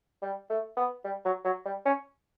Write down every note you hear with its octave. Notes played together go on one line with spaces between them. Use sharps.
G3
A3
B3
G3
F#3
F#3
G3
C#4